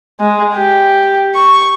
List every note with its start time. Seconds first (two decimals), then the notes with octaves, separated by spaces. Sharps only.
0.20 G#3
0.54 G4
1.35 C#6